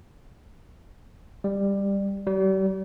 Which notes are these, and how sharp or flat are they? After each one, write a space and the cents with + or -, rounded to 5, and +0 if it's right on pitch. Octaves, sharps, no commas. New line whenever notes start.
G3 +15
G3 -40